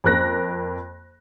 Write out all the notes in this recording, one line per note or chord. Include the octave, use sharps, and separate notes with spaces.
F2 A#3 A#4 F#6 A#6